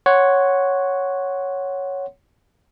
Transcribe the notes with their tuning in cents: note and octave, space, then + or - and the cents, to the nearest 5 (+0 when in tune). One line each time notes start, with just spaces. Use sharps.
C#5 +0 F#5 +0 C6 +0